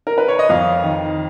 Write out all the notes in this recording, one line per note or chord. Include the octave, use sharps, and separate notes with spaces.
A#4
B4
C#5
D#5
F2 F5
D#3